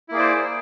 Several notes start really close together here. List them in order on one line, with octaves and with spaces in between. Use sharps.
E4 A#3 G#4 D5 C5